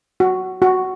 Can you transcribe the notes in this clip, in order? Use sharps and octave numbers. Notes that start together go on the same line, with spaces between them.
F#4
F#4